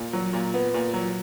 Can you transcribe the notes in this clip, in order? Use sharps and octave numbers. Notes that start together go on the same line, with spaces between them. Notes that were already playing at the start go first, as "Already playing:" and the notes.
Already playing: A#2
F#3
A#2
B3
A#2
F#3